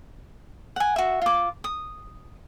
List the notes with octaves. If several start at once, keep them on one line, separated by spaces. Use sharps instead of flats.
F#5 G#5
F#4 E5
F4 D6
D#6